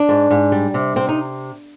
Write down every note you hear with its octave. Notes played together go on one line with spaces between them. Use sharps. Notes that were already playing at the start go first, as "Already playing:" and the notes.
Already playing: D4
G#2
G#2
G3
C3
C3 C4
D#4